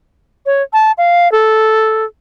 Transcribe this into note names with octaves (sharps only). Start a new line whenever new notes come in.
C#5
A5
F5
A4